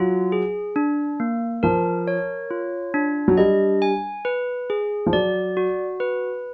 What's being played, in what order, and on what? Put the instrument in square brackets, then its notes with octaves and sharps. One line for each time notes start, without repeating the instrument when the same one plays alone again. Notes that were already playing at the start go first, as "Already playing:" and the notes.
Already playing: [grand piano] F#3 [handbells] F4
[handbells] G#4
D4
A#3
[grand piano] F3 [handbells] A#4
[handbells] C#5
F4
D4
[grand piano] F#3
[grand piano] G3 [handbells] D#5
[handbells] G#5
B4
G#4
[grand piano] F3
[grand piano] F#3 [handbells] D5
[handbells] F#4
B4